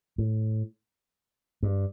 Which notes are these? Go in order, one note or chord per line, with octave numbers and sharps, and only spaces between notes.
A2
G2